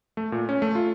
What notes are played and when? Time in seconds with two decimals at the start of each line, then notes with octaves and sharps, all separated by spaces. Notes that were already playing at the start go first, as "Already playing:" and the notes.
0.17 A3
0.32 A#2
0.49 C#4
0.62 A3
0.75 F4